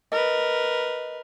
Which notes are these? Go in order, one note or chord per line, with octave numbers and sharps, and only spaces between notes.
A#4 B4 D#5